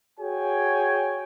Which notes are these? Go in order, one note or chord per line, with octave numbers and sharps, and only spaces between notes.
F#4 G#4 C#5 G5 G#5